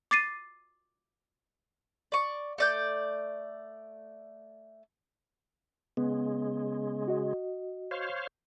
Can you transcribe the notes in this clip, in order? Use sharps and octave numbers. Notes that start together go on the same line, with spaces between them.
D6 A6 C7 D#7
D5 C#6
A3 D5 G6
C#3 G#3 B3
F#4 D#5
C5 C#5 F5